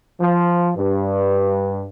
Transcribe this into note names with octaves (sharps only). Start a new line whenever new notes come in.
F3
G2